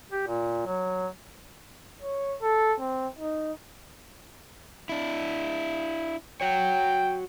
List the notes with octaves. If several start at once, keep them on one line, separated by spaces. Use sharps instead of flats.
G4
A#2
F#3
C#5
A4
C4
D#4
D4 E4
F#4 C#5 G5